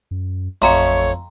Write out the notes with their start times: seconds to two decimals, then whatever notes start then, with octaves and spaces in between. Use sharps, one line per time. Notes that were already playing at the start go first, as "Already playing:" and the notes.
0.11 F#2
0.62 A1 F2 A3 C#5 G5 A#5 C6